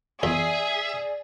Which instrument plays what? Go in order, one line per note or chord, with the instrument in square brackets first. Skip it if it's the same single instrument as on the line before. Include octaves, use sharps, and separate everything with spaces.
[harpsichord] E2 [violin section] G#4 [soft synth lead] D5 [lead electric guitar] E5